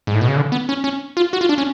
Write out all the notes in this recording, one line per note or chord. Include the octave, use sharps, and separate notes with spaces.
G#2
A2
B2
C#3
D3
B3
C#4
C#4
F4
F#4
F4
D4
C#4